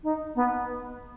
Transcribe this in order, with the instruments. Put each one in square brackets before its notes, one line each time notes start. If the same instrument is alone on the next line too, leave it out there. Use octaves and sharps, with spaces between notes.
[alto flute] D#4
B3